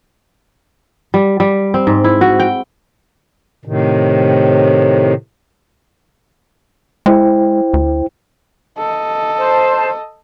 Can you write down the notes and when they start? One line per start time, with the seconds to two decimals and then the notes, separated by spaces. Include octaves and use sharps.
1.14 G3
1.40 G3
1.74 C4
1.87 G#2
2.04 E4
2.21 F#4
2.40 G5
3.65 A2 C3 D#3
7.06 G#3 E4 C5 G5
7.74 D2
8.77 A4 D#5
9.36 C5 A5